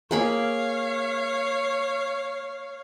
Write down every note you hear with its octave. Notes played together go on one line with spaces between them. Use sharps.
A#3 G#4 C#5 F5 B5